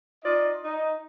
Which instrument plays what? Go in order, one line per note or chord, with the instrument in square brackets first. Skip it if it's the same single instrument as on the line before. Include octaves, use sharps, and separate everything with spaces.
[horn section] D#4 F4 D5 D#5
D#4